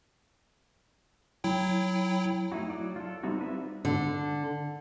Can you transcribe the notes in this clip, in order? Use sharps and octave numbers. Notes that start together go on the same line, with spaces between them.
F#3 E4 G5
A3 D#4 E4 F#4
F#3 D5
F4 A4
G3 C4 D#4 E4 F#4
D4 B4 E5
D3